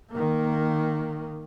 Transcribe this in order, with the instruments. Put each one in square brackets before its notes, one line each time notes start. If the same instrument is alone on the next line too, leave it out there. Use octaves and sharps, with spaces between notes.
[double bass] D#3 A#3